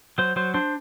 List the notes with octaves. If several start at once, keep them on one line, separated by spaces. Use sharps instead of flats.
F#3 C5
F#3 C5
D4 C5